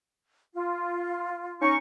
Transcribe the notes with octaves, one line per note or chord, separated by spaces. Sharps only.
F4
C#4 D#4 C#6